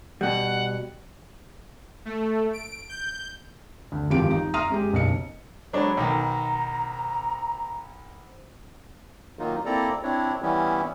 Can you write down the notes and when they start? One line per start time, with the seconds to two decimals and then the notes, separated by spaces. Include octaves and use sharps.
0.21 B2 G3 F#5
2.05 A3
2.53 D7
2.89 G6
3.92 D2
4.10 G#1 E2 F3 G4 D7
4.31 D#4
4.54 E5 A#5 C6 D#6 F6 D#7
4.70 F#2 G#3 G4
4.92 F#1 B1 D#5 C#7
5.73 F#3 G#3 D4 C5 C#5 B5
5.97 B1 D#3 A#5
9.39 D#3 F#3 A#3 D#4 F4
9.65 A#3 C4 E4 A4 D5 A#5
10.03 C4 D4 E4 C#5
10.42 E3 G3 B3 C#4 E4